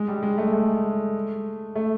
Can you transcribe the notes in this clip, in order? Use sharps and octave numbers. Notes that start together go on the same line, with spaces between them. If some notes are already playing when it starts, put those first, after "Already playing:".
Already playing: G#3
G3
G#3
A3
A3
A3